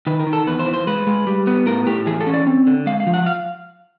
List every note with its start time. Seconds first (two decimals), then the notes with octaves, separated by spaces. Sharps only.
0.07 D#3 B4
0.20 A#4
0.27 D#3
0.33 A4
0.47 E2 B4
0.59 C5
0.66 E3
0.74 C5
0.87 G#3 B4
1.07 G#3
1.27 G3
1.47 B3
1.66 A2 A#4
1.87 A2 G4
2.07 E3 G#4
2.21 A4
2.27 C#4
2.34 D5
2.47 C4
2.67 D3
2.86 G#3 F5
3.00 F5
3.07 F3
3.14 F#5
3.26 F5